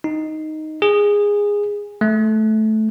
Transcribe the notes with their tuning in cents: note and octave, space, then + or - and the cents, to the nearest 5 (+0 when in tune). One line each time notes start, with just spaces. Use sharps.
D#4 +0
G#4 -15
A3 -15